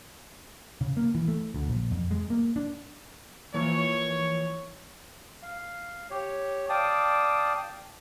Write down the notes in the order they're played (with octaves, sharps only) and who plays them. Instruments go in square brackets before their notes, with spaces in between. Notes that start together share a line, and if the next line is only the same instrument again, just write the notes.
[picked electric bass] C#3
A#3
E3
A3
D2
A#1
F2
G#3
A#3
D4
[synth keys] E3 F3 A#3 [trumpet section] C#5
[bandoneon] F5
G4 C#5
D5 F5 G5 A5 D6 D#6